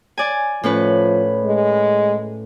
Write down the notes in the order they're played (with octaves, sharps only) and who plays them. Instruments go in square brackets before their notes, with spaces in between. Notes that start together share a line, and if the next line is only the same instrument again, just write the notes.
[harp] D5 G#5
[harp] A2 C#4 B4 [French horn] F3
[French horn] G#3